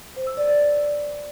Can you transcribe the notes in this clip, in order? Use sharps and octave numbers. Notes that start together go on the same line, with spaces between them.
C5
E6
D5
D5